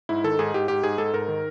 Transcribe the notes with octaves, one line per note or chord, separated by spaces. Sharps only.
G#2 E4
D#3 A4
G#2 G#4
G#2 G4
G#2 G4
G#2 G#4
G#2 A4
G#2 A#4
D#3